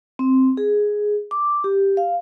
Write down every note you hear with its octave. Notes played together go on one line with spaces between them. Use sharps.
C4
G#4
D6
G4
F5